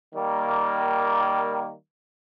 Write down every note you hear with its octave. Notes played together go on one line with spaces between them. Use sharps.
D#3 G3 A#3